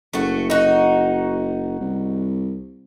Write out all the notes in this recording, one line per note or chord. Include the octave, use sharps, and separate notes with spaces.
F#1 A3 F#4
D#4 F#4
C2